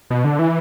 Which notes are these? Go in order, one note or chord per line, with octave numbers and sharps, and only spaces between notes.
B2
D3
E3